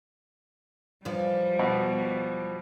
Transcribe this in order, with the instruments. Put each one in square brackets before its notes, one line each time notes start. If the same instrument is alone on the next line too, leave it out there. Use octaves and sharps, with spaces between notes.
[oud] E2 F3 [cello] G3
[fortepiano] B2